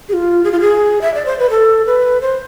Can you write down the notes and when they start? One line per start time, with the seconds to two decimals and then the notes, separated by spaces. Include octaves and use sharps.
0.09 G#4
0.13 F4
0.44 G#4
0.52 F4
0.61 G#4
1.01 E5
1.14 D5
1.25 C5
1.39 B4
1.50 A4
1.86 B4
2.21 C5